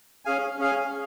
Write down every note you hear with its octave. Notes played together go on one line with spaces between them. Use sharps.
C#4 G#4 F5 G#5
C#4 G#4 F5 G#5